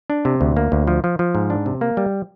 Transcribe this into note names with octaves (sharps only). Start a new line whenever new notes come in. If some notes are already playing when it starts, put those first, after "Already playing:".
D4
C3
D2
A#3
D2
F3
F3
F3
G#2
D4
C3
A#3
G3